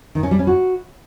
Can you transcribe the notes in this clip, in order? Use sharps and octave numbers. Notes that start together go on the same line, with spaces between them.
D#3
C#4
G3
C#4
F#4